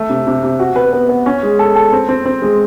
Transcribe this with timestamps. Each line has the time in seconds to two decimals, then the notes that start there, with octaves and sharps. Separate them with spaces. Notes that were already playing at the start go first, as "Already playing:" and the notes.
Already playing: A3
0.10 C3
0.27 C3
0.43 C3
0.59 F#4
0.76 B4
0.93 B3
1.09 B3
1.26 C#4
1.43 G#3
1.59 A4
1.76 A4
1.92 C4
2.09 C4
2.25 C4
2.42 G#3